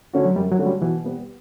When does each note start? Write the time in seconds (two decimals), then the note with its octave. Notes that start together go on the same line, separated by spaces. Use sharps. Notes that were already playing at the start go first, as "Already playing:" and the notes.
0.13 D3 A3 C#4 F#4
0.25 F#3
0.36 F#2 G3
0.51 F#3
0.58 D3 A3 C#4 F#4
0.66 G3
0.82 B2 E3
1.04 G3 B3